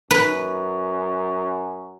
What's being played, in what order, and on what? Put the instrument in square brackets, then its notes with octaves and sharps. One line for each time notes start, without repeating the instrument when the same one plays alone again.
[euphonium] F#2 [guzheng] B4